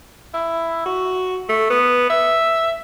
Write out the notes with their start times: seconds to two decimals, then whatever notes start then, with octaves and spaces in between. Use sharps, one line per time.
0.34 E4
0.86 F#4
1.49 A3
1.70 B3
2.10 E5